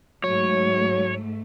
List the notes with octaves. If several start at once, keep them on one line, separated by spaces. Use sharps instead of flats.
G#2 F#3 A3 C#5